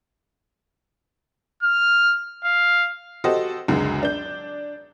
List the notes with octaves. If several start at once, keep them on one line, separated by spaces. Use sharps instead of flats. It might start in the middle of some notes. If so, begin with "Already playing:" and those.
F6
F5
F#4 G4 A4 C5 D#5
C#2 F#2 D3 G#3
D4 G6